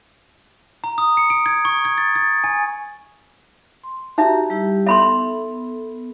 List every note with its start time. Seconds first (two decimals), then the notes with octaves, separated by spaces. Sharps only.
0.84 A#5
0.98 D#6
1.17 C#7
1.30 D7
1.46 G#6
1.65 C#6
1.85 G#6
1.98 A6
2.16 A6
2.44 G#5
3.84 C6
4.18 D#4 F#4 G4 E5 A#5
4.50 G3 E4 G4
4.86 B3 A4 E5 B5 C6